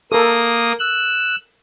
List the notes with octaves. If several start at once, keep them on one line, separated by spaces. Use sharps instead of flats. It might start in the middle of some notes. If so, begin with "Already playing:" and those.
A#3 A4 A#4 D#6
E6 F#6